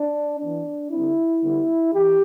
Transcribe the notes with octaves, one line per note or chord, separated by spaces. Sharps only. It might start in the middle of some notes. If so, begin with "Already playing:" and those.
Already playing: D4
E3 B3 D4
D3 G3 C4 E4
D3 G3 B3
E3 G4